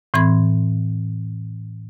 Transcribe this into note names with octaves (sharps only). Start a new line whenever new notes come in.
A2 E3 C4 B5 C6 G#6